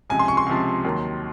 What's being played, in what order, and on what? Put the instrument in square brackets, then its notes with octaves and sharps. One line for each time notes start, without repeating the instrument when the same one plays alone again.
[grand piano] C#2 C3 F3 G#5
C6
C#6
C6
C#2 C3 F3
D#2 D#3 F#3